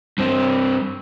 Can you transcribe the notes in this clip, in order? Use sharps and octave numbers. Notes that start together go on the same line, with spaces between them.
G2 C4